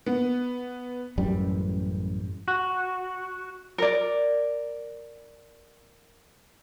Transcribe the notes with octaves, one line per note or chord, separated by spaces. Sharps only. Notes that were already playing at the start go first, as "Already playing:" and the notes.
B3
A1 F#2 G3
F#4
A#4 D5